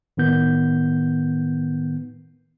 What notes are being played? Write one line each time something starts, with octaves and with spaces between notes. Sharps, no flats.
A2 D#3 B3 G6